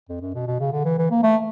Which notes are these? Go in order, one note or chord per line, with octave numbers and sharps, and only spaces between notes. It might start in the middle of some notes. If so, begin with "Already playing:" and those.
F2
F#2
B2
B2
C#3
D3
E3
E3
A#3
A3